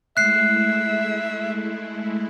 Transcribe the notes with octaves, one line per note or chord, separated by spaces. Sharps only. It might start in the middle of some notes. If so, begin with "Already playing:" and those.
G#3 A3 E4 E5 F#6 C7